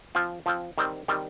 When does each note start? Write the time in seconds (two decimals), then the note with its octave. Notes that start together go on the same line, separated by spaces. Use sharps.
0.15 F3 C4 F4
0.46 F3 C4 F4
0.78 D#3 G3 C4
1.08 D#3 G3 C4